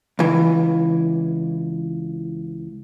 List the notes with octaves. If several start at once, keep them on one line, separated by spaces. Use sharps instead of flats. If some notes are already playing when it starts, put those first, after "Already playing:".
C#2 E3